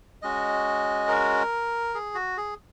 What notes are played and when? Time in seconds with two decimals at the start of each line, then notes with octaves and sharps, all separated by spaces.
0.22 G#3 C#4 F#4 D#5
1.08 A#4
1.94 G#4
2.15 F#4
2.37 G#4